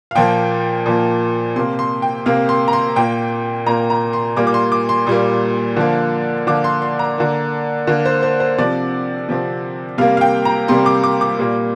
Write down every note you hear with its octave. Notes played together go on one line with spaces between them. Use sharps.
F5
A#2 F3 A#3 G5
A#2 F3 A#3
C3 A#3 C6
C6
G5
C3 A#3 F5
C6
A#5
C6
A#2 A#3 G5
A#2 A#3 A#5
A#5
C6
A#2 G3 A#3 D6
D6
C6
D6
C6
A#2 G3 A#3
D3 F3 A#3
D3 F3 A#3 D6
C6
C6
A#5
D3 A#3
D3 A#3
C5
C5
C5
C3 F3 C4 D5
C3 F3 C4
C3 G3 A#3 F5
F5
G5
A#5
C3 G3 A#3 C6
D6
D6
D6
A#2 G3 A#3